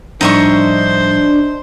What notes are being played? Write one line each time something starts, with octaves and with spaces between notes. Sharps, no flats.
A2 F3 G3 D4 D#4 C5 E5 C#6